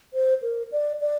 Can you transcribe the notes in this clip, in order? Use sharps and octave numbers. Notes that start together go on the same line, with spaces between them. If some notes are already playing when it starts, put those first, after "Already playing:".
C5
A#4
D5
D5